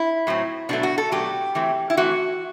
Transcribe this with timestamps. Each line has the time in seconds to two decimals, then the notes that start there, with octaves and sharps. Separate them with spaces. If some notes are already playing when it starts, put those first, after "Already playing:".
Already playing: E4
0.27 A2 F#3 C4
0.69 B2 F#3 A3 D4
0.83 F#4
0.98 A4
1.11 B2 F#3 A3 G4
1.55 E3 A3 C4
1.90 E4
1.97 E3 A3 C4 F#4